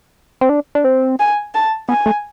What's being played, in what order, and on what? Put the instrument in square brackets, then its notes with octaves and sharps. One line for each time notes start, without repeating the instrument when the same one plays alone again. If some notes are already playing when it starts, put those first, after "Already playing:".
[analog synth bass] C4
D4
D4
C4
[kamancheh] G#5
A5
[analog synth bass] B3 [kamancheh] G#5
[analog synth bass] A3